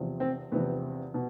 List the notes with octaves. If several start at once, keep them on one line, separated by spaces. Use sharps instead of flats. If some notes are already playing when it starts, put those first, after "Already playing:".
Already playing: E2 C3 F3
C4
E2 C3 F3 B3
B2